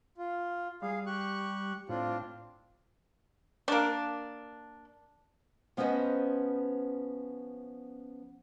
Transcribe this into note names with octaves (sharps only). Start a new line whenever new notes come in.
F4
G3 G#4 F5
G4 C#6 F#6
A2 C4 D4 F4
A#3 D4
F3 B3 C#4 B4 C5 D#5